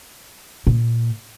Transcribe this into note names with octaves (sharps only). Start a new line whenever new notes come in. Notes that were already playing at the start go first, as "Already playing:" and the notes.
A#2